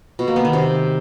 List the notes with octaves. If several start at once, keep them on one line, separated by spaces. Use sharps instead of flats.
B2
A#3
B3
D#3
C3